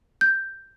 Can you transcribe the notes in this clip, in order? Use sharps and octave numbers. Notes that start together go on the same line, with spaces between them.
G6